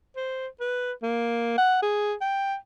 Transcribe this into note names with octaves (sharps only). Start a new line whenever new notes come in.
C5
B4
A#3
F#5
G#4
G5